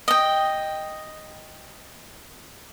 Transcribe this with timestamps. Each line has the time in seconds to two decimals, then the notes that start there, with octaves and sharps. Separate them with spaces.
0.08 D#5 G5